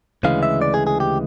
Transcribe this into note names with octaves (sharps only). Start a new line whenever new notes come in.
D2 C#3 E3 G#3 F5
E5
D5
G#4
G#4
G4